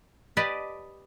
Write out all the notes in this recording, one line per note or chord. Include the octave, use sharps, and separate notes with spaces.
G4 B4 D5 D#5 A5